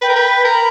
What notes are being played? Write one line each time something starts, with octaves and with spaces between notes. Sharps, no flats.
B4 G5
A#4
B4
A#4 B5